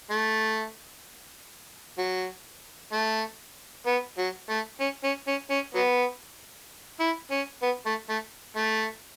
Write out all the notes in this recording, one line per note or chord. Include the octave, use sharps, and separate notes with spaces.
A3
F#3
A3
B3
F#3
A3
C#4
C#4
C#4
C#4
F#3 B3
E4
C#4
B3
A3
A3
A3